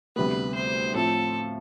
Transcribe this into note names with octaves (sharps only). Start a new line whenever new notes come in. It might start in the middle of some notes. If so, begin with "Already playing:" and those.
D2 C3 G3 B3 B4
C5
A2 F3 C4 F4 A4